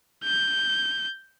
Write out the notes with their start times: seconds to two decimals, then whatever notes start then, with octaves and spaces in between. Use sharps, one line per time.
0.24 G6